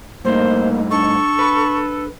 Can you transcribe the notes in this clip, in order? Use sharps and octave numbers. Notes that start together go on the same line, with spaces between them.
G2 A3 A#3 D#4 C5
D4 A4 C#6
B4